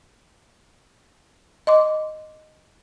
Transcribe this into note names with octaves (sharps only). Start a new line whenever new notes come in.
D#5 C6 D6